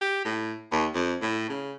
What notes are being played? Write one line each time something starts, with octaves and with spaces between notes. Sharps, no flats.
G4
A2
D#2
F2
A2
C#3